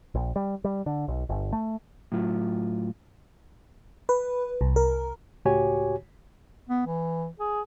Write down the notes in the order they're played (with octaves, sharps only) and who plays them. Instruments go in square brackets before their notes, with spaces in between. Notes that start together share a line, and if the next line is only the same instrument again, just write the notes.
[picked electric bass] A#1
G3
G3
D3
B1
G1
A3
[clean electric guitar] A2 F#3 F4
[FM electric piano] B4
C2
A#4
[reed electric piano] C#2 A2 F#4 G4 C#5 G#5
[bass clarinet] B3
E3
G#4